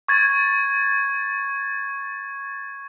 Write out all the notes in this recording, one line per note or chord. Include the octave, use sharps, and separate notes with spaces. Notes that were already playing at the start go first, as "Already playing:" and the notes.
C#6 G#6 A6